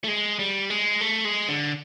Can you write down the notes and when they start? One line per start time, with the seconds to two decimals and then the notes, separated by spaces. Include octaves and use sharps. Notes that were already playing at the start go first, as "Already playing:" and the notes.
0.04 A3
0.08 G#3
0.39 G3
0.70 G#3
1.01 A3
1.25 G#3
1.48 D3